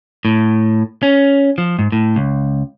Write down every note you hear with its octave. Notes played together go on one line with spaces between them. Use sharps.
A2
C#4
F3
G#2
A2
C#2